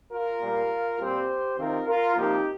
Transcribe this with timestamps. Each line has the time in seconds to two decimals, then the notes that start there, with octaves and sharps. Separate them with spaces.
0.11 F4 A#4
0.41 A#2 G3 A#3
1.00 A#2 G3 C4 G4 C5
1.58 C3 D#3 C4 F4 A#4
1.87 F4 A#4
2.16 C3 F3 A#3 D#4 G4